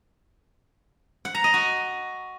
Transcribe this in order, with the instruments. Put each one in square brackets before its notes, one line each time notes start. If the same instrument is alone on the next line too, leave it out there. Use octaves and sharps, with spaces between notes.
[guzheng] F#5
A#5
D#5
F#4